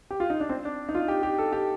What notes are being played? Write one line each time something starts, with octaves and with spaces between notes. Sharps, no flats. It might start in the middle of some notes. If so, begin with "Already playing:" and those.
G4
F4
D#4
D4
C4
D4
D#4
F4
G4
G4
A4
G4